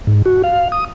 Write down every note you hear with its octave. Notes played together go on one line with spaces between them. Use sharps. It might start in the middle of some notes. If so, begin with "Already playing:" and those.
G#2
F#4
F5
D#6